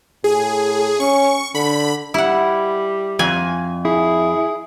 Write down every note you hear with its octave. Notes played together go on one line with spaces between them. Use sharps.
A2 G#4
C#4 C#6
D3 B5
G3 E4 F#5
F2 G#5
E4 G#4